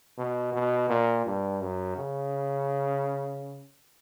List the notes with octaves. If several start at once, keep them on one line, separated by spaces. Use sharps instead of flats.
B2
B2
A#2
G2
F#2
C#3